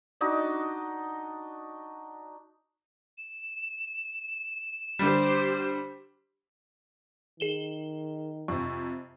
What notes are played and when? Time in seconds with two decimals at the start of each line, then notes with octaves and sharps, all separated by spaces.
0.21 D4 D#4 F#4 D#5
3.18 E7
4.99 D3 G3 G4 C5
7.40 D#3 G#4 E7 G7
8.48 F2 C3 C#6